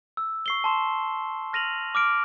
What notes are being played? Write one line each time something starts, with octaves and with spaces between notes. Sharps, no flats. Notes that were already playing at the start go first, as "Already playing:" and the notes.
E6
C#6 C7 G7
A5 C6 E7
F6 A#6 D#7 F7 F#7
D6 F6 D7